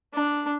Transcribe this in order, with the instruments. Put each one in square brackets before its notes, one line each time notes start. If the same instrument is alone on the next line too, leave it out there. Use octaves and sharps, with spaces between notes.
[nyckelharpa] D4